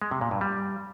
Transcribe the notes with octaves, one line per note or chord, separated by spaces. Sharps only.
G#3
C3
A#2
G2
G3